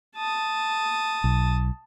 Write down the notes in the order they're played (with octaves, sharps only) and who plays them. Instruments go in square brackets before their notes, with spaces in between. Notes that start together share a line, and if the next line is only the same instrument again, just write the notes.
[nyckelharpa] A5 D#6
[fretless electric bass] B1